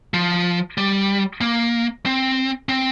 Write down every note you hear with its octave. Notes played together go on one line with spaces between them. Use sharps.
F3
G3
A#3
C4
C4